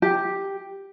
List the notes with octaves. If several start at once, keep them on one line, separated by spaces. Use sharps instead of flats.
G4